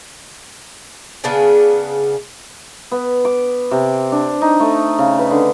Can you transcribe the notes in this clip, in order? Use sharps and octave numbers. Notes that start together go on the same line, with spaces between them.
C#3 B3 D4 G#4
B3
D6
C3
D4
D#4
A3
C#3
B4
D3